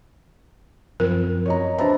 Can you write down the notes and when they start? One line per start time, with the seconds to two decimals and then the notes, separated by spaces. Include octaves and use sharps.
1.00 F#2 F3 C4 A#4
1.46 C#5 D#5 A#5
1.78 D4 B4 C5 E5 A5 A#5